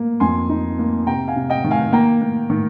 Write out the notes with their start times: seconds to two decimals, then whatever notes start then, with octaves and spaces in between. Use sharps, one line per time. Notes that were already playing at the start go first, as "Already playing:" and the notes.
Already playing: A#3
0.20 F2 G#5 C6
0.49 D#4
0.79 A#3
1.07 C3 G5 A#5
1.28 F5 G#5
1.36 C3
1.50 D#5 G5
1.64 D#3
1.71 F5 G#5
1.93 A#3 G5 A#5
2.22 A#3
2.50 D#3